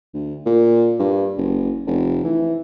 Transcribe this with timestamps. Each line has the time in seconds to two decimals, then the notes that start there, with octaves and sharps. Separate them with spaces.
0.14 D2
0.46 A#2
0.99 G2
1.37 F#1
1.86 F1
2.24 E3